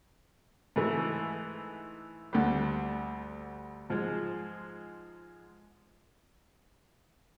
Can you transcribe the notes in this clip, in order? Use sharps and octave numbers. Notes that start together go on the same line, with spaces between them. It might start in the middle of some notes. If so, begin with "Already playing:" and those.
G#2 E3 A3
D2 D3 G3
G#2 F3 G#3